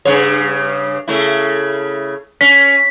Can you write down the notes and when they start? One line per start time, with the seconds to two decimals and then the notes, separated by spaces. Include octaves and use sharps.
0.05 G2 C#3 C#5
1.08 C#3 A3 E4
2.41 C#4 B6